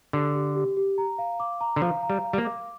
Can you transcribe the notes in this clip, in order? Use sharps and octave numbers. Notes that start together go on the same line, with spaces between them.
D3 G4
G4
G4
G4
A#5
F5
D6
A#5
D3
F3 F5
A#5
G3
F5
G3
A#3
D6